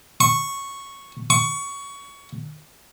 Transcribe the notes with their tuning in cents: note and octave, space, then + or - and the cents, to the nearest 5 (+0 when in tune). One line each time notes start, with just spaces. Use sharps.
C#6 -5
C#6 +20